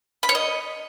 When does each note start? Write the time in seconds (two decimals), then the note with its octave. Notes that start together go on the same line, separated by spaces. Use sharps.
0.23 B5
0.29 C#5
0.35 D#5